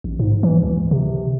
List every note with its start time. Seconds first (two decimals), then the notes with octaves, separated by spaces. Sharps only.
0.04 A1
0.19 G#2
0.43 E3
0.63 C#2
0.91 C3